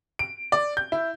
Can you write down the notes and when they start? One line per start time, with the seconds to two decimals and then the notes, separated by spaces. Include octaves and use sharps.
0.19 D7
0.52 D5
0.77 G6
0.92 E4